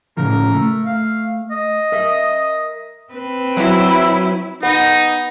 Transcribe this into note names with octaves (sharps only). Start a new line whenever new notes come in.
A2 C#3 F3 A#4
A3
F5
D#5
A#4 E5
C4 B4
F#3 E4
B3 D#4